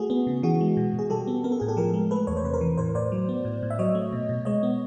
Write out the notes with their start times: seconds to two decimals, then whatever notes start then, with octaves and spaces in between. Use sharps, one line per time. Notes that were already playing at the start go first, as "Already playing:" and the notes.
Already playing: A3 F#4 G#4
0.10 B3
0.27 C#3
0.43 E3 F#4 G#4
0.61 G#3
0.77 B2
0.93 B2
0.99 G#4
1.10 G3 G4 A4
1.27 B3
1.44 B3 A#4
1.52 A4
1.60 A2 G#4
1.68 G4 A4
1.77 F3 G#4 A#4
1.94 G#3
2.11 A3 A4 B4
2.27 E2 C#5
2.37 C5
2.44 C3 B4
2.53 A#4 C5
2.61 E3
2.78 A2 A#4 C5
2.95 A2 C5 D5
3.12 F#3
3.29 B3
3.45 A2
3.63 A2
3.70 E5
3.79 F#3 C#5 D#5
3.95 A3
4.12 B2
4.29 B2
4.45 G#3 C#5 D#5
4.63 B3